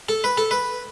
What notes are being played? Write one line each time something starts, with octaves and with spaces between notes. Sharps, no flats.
A4
B4
A4
B4